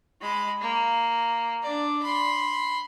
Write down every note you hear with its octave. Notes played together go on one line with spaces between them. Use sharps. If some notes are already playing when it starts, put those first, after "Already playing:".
G#3 B5
A#3
D4 D5
B5 C6